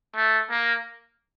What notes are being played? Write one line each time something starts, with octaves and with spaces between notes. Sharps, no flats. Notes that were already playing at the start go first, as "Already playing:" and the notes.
A3
A#3